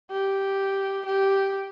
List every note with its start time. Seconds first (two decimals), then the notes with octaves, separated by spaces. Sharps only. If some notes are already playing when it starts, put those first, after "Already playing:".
0.11 G4
1.05 G4